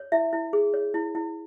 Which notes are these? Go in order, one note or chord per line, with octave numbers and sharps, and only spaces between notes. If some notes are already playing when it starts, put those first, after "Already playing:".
Already playing: C#5
E4 E5
E4
G#4
C#5
E4
E4